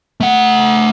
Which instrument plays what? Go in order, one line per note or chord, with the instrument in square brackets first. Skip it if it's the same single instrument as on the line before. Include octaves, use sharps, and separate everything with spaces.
[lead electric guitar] A3 F#5